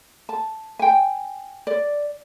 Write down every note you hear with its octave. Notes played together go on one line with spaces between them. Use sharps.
A5
G5 G#5
D5